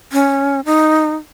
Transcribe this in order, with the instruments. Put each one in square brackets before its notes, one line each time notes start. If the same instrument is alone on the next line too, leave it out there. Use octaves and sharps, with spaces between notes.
[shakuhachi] C#4
D#4